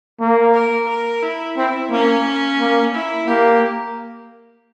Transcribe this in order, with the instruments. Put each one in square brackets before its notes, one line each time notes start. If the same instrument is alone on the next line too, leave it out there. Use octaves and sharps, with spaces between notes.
[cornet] A#3
[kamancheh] A#4
A#4
E4
[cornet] C4 [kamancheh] E4
[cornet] A#3 [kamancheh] C#4
[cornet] A#3
[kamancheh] E4
[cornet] A#3 [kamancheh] G4